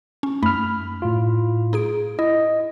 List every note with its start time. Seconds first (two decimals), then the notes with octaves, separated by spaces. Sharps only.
0.23 C#4
0.43 F#2 A3 D#4 B5 F6
1.02 A2 F4
1.73 D#4 G#4 D7
2.19 E4 D#5